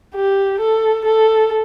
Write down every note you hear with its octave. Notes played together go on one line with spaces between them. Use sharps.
G4
A4
A4